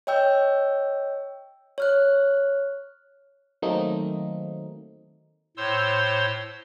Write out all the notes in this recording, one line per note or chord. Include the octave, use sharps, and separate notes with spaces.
C#5 D#5 G5 E6 G6
C#5 F6 F#6
D#3 F#3 A3 A#3 C4 D#4
A2 C5 C#5 C6 E6